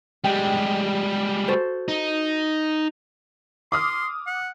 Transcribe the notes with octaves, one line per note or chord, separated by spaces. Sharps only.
G3 G#3 G4 G5
F#4 A4 C5
D#4
C6 D6 D#6 F6
F#5